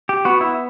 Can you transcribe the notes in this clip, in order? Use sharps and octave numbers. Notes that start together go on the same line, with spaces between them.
G4
B3 F#4
E4